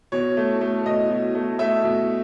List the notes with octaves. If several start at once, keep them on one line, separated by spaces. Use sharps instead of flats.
B2 C#5
A3
A3
B2 D#5
B2
A3
A3 E5
B2